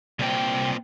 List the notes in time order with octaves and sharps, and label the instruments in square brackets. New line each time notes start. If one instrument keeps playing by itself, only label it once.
[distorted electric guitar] C2 G5 [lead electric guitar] A#2 C4